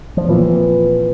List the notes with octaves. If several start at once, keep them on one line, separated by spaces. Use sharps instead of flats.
F3
A#2 E3 F3 C4 F4